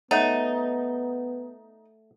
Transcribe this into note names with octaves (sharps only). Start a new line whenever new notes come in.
A3 B3 D#4 C#5 F#5